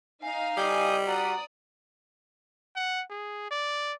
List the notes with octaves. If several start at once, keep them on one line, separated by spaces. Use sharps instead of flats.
D#4 F5 G#5
G3 D#5 G5 G#5 D6 D#6 G6
F#4 D5 F#5 A#5 D#6
F#5
G#4
D5